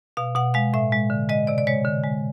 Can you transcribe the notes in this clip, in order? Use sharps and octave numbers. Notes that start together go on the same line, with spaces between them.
B2 F5
B2 F#5
G#3 F5
A2 E5
G#3
D3
G#3 D#5
C3 D5
D5
G#3 C#5
D3
G#3